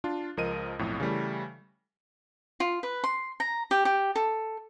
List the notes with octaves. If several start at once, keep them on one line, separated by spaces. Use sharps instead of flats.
D4 F4
C#2 F3 A#4 D#5 D#7
B1 F2 A2
C#3 E3 G3 A3
F4
B4
C6
A#5
G4
G4
A4